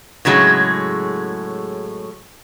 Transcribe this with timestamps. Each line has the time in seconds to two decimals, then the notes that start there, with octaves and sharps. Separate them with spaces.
0.25 A2 C#3 F#3 G#3